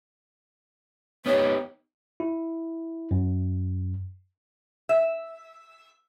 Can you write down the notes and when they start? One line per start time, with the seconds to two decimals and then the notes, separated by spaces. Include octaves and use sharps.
1.26 B3 D#4 G4 C#5
2.20 E4
3.11 F#2
4.89 E5